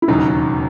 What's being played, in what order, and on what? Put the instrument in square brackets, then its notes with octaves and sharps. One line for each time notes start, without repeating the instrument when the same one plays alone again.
[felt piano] E4
[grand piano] E1 D#2 C#3 F#3 [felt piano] D#4